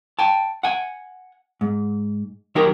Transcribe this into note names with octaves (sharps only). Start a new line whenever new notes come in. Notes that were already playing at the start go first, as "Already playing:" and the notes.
G5 A5
F#5 G#5
G#2
D#3 F#3 D#4 G4 A#4